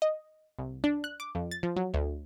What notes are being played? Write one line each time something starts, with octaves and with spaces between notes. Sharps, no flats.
D#5
C2
D4
F#6
D6
F2
A6
F3
F#3
D2